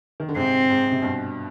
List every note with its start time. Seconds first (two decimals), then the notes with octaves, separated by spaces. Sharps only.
0.20 D#3
0.29 D3
0.36 G#2 C3 C4
0.70 G#2
0.92 C3
1.02 G2 B2